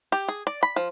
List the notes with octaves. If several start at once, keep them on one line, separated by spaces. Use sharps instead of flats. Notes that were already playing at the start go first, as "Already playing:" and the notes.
G4
G#4
D5
B5
F3